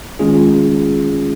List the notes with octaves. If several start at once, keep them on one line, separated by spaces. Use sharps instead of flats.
D#3 G#3 C#4 F4 G#4